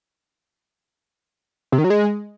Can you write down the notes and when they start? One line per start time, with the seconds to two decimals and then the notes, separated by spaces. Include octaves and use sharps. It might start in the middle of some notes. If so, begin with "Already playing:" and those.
1.72 C3
1.78 D#3
1.84 F#3
1.90 G#3